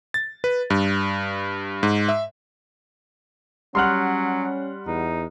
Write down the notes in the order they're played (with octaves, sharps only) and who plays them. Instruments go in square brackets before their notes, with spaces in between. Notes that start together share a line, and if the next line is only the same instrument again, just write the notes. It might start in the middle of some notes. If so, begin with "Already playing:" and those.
[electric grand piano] A6
B4
G2
G#2
E5
[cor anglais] F#3 [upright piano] G3 F#5 [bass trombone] C#4 [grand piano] C6 F6 F#6
[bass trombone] E2 [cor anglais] D#4